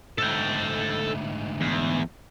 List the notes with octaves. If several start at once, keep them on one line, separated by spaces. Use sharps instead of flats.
D2 G#2 A4 G5
E2